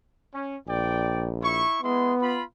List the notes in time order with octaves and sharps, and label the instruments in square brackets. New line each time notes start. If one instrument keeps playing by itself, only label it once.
[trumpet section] C#4
[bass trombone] A#1 [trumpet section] D5 G5
[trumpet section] E4 C#6
[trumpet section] G#3 E4 C6 [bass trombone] B3
[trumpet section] F4 B5